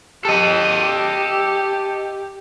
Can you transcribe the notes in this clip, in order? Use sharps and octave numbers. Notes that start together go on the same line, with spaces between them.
G4 A4 D#5